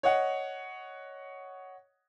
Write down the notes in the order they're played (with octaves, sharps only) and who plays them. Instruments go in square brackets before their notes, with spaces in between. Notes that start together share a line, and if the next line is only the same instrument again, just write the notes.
[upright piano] C#5 D#5 F#5